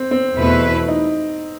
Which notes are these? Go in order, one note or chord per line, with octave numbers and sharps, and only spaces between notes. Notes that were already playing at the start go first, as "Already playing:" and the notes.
Already playing: C4
C4
E2 B2 A3 E4 B4
D#4